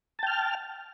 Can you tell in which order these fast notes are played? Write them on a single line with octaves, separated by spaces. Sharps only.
A5 G5 F6